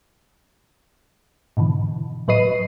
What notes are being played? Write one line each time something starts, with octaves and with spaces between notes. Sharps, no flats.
G#2 B2 D3 E3
A2 F#3 B4 D#5 C7 D#7